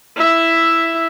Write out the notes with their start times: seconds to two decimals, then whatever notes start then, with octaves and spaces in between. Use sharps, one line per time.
0.16 E4 E5